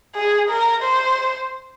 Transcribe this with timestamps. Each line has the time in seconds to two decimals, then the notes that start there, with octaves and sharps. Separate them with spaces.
0.15 G#4
0.50 A#4
0.83 C5